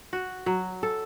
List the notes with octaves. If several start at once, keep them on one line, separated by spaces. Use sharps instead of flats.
F#4
F#3
A4